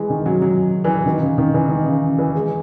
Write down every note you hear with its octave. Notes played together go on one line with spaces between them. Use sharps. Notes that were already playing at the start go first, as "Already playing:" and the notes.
Already playing: E3 G#3
D#3
F#3
F#3
E3
D#3
C#3
D#3
E3
D#3
C#3
E3
G#3